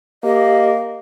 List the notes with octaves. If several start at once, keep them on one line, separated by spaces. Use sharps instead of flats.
A#3 G4 D#5